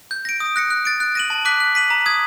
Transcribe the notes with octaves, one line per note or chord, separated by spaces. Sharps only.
G6
A#6 D7
D#6
F#6 A#6 C#7
F#6
A6 D7
F#6
A#6 D#7 F#7
A5
D6 F#6 B6
F#6
B6 D#7 F#7
A#5
D#6 G#6